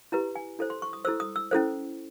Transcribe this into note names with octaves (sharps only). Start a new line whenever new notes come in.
E4 G4 B4 A#5
G#5
E4 A4 C5
C6
C#6
D#6
E4 A4 C5 E6
D#6
E6
C#4 E4 A4 C5